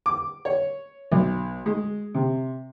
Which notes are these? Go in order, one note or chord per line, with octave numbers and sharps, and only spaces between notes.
D6
C#5
B1
G#3
C3